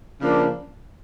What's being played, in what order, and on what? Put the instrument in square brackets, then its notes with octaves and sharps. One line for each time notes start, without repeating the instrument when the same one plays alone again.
[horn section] C#3 F3 A#3 D4